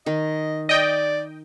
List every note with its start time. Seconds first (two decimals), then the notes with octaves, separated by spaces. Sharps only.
0.06 D#3 D#5
0.69 D5 D#5 G5